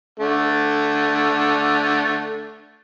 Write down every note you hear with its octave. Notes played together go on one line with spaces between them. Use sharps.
D3 A3